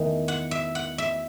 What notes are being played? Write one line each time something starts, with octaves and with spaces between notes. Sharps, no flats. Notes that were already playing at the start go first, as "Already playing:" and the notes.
Already playing: E2 D#3 A3
F#5
E5
F#5
E5